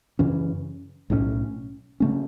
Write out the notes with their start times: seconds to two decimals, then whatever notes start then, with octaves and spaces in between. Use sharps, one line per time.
0.19 F#2 C#3 E3 C#4
1.10 B1 A2 E3 C#4
2.00 C#3 A3 C#4